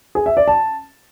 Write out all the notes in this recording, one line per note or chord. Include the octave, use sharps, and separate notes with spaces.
G#4
E5
D5
A5